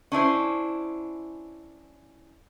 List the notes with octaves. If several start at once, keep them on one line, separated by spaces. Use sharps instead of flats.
C#4 D4 E4 C5